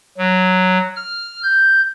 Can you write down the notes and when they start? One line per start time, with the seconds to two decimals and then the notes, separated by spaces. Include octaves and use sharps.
0.18 F#3
0.96 F6
1.43 G6